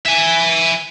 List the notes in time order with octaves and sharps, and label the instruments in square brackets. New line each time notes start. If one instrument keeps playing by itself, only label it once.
[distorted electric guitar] E5 G#5